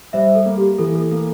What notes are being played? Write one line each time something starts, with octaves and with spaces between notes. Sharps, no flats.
G3 C5 E5
A4
A#3
G4
E3 A4
A4
A#3 A4